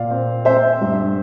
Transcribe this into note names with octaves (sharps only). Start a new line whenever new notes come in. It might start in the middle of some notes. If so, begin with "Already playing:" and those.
Already playing: A#2 D5 F5
C4
C4 C5 E5
G2